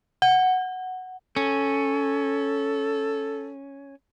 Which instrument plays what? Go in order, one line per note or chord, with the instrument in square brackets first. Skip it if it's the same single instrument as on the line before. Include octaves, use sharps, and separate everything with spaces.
[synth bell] F#5
[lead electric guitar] C#4 [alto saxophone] A4